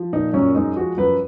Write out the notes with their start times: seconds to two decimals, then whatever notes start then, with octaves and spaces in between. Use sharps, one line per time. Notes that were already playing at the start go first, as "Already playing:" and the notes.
Already playing: F3
0.13 A#2 D#4
0.34 F#2 C#4
0.55 G#3 D#4
0.77 F3 F#4
0.98 F#2 B4